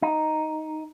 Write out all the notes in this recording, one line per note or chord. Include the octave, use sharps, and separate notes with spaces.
D#4